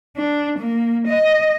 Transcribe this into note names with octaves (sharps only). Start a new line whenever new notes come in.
D4
A#3
D#5